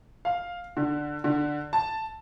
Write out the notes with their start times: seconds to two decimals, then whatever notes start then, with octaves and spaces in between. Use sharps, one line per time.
0.25 F5
0.77 D3
1.24 D3
1.73 A5